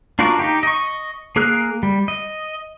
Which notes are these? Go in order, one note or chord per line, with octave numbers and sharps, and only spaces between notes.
D4 F4 F#4 A#4 D5
D#4 G4
D#5 C#6
A#3 G#4 A#4 F6 F#6
G3
D#5